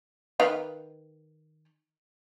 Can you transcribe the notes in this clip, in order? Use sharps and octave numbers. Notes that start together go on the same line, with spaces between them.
D#3 B4 F5